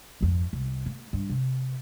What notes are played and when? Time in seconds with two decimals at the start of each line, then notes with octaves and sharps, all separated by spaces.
0.21 G#1 F2
0.53 C2
0.86 A#3
1.13 G2
1.30 C3